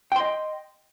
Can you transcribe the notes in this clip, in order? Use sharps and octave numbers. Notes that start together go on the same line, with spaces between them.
D#5 G5 C6